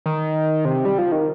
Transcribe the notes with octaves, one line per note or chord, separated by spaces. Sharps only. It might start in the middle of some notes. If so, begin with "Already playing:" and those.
D#3
C3
G3
F3
D#3